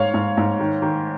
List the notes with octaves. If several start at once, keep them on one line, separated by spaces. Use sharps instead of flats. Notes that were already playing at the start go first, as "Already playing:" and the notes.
Already playing: G#2 C#5 F5
G#2
G#2
D#3
D#3